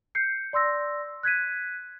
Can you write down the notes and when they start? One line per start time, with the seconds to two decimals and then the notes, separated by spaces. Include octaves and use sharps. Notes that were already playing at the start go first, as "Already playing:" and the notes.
0.15 G6 C7 C#7
0.53 D5 C6 E6 A#6
1.23 F#6 G#6 B6 D#7